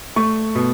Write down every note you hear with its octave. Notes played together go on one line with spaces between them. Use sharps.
A3 C#6
B2